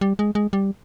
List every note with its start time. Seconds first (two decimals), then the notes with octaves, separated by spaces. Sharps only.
0.01 G3
0.19 G#3
0.35 G#3
0.53 G3